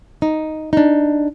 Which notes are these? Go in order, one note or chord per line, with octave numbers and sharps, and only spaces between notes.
D#4
D4 D#4